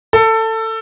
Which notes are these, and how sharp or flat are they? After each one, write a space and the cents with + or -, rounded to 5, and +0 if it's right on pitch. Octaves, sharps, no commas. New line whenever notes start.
A4 +20